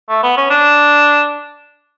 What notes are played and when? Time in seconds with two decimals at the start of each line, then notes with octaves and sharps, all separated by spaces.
0.09 A3
0.23 B3
0.37 C#4
0.50 D4